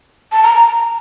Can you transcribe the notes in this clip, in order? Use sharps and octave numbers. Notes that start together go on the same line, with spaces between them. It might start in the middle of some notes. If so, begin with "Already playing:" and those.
A5
A#5
A#5